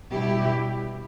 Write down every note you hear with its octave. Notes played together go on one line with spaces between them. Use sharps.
B2 G3 E4 G4